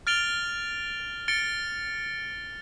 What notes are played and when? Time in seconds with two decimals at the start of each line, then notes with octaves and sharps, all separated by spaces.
0.07 F6 A6 D7 F7 G7
1.28 A6 C#7 D7 G7